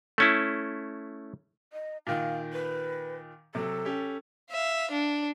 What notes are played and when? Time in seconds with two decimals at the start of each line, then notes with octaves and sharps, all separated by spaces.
0.18 A3 C#4 E4
1.73 D#5
2.07 A#2 D#3 F5
2.53 B4
3.55 C3 F#3 A4
3.85 C#4 G4
4.50 E5 F5
4.91 D4